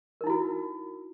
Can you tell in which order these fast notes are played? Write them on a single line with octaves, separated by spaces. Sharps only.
A#4 D#4 E4 F#4